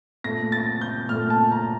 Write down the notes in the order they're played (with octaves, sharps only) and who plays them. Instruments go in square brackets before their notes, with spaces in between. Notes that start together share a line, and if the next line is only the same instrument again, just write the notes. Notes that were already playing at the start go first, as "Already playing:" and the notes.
[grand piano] A#2 A3 A#6
A6
G6
A#2 A3 F6
A5
A#5